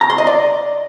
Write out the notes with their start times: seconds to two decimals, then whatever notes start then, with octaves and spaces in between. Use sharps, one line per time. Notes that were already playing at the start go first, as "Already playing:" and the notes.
0.01 A#5
0.10 C6
0.18 D#5
0.27 D5